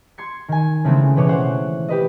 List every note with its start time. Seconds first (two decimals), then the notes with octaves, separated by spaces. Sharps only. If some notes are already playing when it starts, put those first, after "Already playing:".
0.18 C6 G#6 C#7
0.48 D#3 G#5
0.84 C#3 E3 G#3 A3 B3 C4
1.16 B2 E3 C#5 D6
1.29 C5 C#5 F#5
1.88 G4 B4 D#5